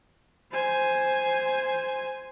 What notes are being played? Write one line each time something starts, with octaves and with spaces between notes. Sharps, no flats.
C5 G#5